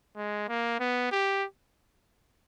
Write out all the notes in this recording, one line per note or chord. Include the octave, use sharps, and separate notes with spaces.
G#3
A#3
B3
G4